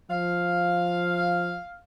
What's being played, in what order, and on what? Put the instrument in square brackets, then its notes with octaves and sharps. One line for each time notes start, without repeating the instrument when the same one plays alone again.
[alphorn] F3 [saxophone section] F5